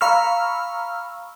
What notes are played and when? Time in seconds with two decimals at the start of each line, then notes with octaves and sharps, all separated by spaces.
0.01 F5 A#5 B5 C#6 E6 F6